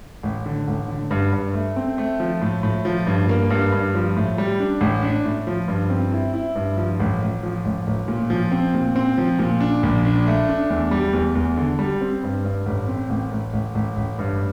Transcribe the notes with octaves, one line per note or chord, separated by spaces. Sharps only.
A1
D3
A1
D3
G2
G2
A3
C4
A3
F3
A2
A2
F3
G2
A#3
G2
G2
F3
A2
G3
D4
A1
D4
A2
F3
G2
C4
E4
E4
G2
F3
A1
A1
F3
A1
A1
A#2
F3
C4
A#2
C4
F3
A#2
D4
A#1
D4
A3
D4
E2
G3
E2
E2
D3
G3
C4
G2
G2
A1
C4
A1
A1
A1
A1
A1
G2